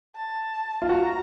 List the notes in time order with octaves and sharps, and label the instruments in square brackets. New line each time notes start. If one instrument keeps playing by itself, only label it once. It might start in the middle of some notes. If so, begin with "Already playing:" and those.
[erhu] A5
[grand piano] F4
[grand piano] F#4 [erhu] A#5